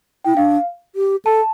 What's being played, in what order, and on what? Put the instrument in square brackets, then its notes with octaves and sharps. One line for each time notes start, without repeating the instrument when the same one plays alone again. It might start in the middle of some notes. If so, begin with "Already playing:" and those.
[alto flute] E4 [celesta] G5
[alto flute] D4 [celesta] F5
[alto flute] G4
[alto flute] A4 [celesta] A5